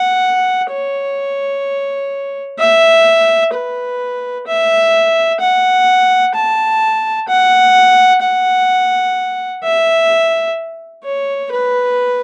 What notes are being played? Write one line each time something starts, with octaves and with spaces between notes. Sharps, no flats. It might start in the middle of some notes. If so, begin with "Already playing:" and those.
Already playing: F#5
C#5
E5
B4
E5
F#5
A5
F#5
F#5
E5
C#5
B4